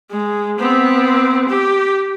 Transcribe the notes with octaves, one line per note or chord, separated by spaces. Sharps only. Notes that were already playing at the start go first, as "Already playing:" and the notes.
G#3
B3 C4
G4